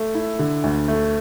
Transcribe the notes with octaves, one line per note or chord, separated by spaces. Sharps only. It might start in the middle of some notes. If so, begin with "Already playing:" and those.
Already playing: A3
E4
D3
D2
A3